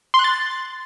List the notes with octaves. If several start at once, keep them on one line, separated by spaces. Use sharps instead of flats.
C6
F#6
A6